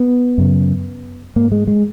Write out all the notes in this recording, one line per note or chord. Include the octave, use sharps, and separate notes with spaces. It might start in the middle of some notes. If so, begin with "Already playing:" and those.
Already playing: B3
F#2 C#3
G#2 A#3
G#3
G#3